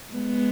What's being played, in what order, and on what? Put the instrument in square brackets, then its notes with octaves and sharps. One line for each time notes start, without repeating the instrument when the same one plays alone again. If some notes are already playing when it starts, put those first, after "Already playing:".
[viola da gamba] G#3 B3